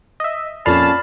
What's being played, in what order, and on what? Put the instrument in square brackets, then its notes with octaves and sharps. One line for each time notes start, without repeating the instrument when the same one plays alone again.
[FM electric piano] D#5 E5
[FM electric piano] F2 F5 [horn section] A#2 C#4 A5 [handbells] D5 B5 F6